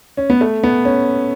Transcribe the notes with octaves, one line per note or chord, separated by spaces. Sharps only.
C#4
B3
A3
B3
C#4